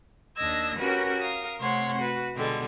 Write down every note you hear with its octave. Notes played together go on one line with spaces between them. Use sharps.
D#2 D4 D#5 E6 G#6 A#6
C#4 F#4 G4 A#4 B4
A#4 F5 D#6
C3 A3 C4 C#5 F#5 C6
F#4 B4
B2 D3 G3 G#3